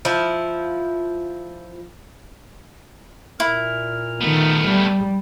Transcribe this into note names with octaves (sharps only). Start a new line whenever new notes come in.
F3 E4
A#2 E4 A#4 F6
D#3 A3 B3
G3